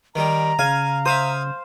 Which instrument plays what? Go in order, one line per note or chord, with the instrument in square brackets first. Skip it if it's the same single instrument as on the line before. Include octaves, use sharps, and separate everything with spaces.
[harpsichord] D#3 G3 [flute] A#5
[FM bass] C#3 [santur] F5 [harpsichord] G#5
[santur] C5 [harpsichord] E5 F5 D#6